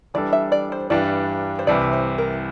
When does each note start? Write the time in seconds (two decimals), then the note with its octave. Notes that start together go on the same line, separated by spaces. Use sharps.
0.14 E3 G3 D4 A4 D5
0.33 E5
0.52 D5
0.72 C5
0.90 G2 E3 G3 D4 D5
1.59 C5
1.67 C2 C3 E3 D5
1.93 C5
2.18 A#4